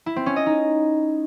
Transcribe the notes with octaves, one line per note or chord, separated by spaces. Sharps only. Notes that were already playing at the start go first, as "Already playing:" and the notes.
E4
C4
C#4
D#5
D#4